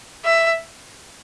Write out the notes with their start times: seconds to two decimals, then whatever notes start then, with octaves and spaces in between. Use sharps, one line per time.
0.25 E5